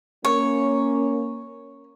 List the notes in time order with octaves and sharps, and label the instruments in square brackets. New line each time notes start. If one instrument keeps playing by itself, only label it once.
[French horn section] A#3 C#4 [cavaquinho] C#5